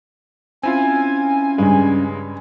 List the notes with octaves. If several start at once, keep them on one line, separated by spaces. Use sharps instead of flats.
C4 C#4 E4 F4 G#5
G2 C#3 G#3